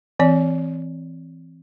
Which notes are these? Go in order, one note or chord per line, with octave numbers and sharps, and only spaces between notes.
E3 C4 D5